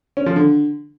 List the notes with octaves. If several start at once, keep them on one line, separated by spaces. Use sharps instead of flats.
C#4
F3
D3